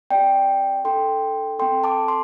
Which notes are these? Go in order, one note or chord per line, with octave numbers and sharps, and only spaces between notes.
C4 G4 D5 G5
D4 A4 G5 C6
C4 A4 G5 C6
A5 D6
C6